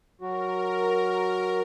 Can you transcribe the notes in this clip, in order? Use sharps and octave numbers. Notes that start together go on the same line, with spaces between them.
F#3 F#4 A#4